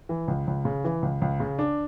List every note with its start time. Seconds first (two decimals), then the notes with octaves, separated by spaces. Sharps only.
0.09 E3
0.28 C#2
0.47 C#2
0.65 C#3
0.84 E3
1.02 C#2
1.22 C#2
1.40 C#3
1.59 D4